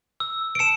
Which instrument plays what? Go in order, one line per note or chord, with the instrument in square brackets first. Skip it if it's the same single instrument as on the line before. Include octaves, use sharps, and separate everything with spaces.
[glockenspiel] E6
D7
A5 C#7 E7